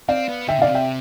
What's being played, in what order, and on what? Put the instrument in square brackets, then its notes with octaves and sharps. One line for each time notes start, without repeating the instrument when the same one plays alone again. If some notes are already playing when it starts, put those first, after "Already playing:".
[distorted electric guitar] C4 [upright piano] D5 F5
[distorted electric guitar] B3
[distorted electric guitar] D3 [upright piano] E5 G5
[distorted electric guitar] B2 [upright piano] D5 F5
[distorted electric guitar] C3
[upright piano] E5 G5